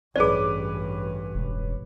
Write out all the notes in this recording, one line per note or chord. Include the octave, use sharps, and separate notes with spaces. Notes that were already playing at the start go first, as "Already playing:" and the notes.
A1 G2 C#4 G#4 B4 D5 D6
E1